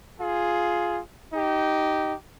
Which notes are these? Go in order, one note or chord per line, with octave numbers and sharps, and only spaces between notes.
F4 G#4
D#4 G4